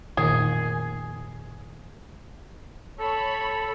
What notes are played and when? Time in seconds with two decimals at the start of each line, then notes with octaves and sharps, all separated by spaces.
0.17 F1 A#2 D#3 G#4
2.99 A4 C#5 B5